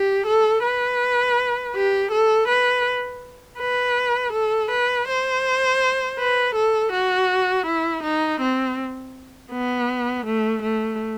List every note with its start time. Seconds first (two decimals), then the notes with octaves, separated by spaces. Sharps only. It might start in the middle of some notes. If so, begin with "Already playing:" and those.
Already playing: G4
0.27 A4
0.64 B4
1.75 G4
2.12 A4
2.49 B4
3.59 B4
4.33 A4
4.71 B4
5.08 C5
6.19 B4
6.55 A4
6.92 F#4
7.67 E4
8.04 D#4
8.41 C4
9.51 B3
10.26 A3
10.63 A3